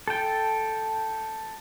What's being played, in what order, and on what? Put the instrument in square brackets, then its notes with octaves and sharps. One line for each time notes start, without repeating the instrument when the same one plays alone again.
[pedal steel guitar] A4 G5